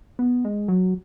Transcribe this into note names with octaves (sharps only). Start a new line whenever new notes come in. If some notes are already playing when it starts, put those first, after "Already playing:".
B3
G#3
F#3